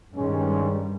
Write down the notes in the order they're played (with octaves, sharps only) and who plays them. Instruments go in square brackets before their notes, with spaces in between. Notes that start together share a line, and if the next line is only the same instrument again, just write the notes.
[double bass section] G2 G3 [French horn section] D#3 G#3 C#4